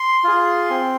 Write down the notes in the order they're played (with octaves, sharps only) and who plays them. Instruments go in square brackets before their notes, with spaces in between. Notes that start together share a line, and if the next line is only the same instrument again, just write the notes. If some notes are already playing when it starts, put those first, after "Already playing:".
Already playing: [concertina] C6
F4 G#4
C4